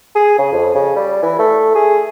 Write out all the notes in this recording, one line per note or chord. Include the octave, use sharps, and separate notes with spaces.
G#4
C#3
F2
C#3
G3
E3
A3
G#4